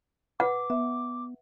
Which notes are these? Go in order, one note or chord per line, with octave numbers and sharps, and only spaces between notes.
B4 F#5 D6
B3 E5